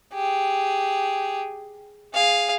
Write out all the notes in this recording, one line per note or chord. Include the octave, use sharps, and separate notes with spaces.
G4 G#4
G#4 F5